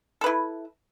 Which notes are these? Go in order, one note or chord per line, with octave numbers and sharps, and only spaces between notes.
E4 A4 B4